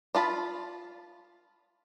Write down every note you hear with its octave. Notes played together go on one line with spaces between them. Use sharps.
D4 F4 A5 B5